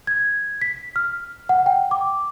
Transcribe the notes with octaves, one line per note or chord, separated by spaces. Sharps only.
G#6
B6
F6
F#5
G5
D6